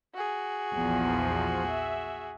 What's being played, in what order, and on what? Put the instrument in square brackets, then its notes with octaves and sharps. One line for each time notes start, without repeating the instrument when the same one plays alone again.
[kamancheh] F#4 G#4
[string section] A#1 E2 F3
E5